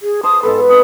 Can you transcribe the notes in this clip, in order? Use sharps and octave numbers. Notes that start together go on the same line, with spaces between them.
G#4
C5 A5 D#6
G#2 B3 A4 B4
A4 B4 D#6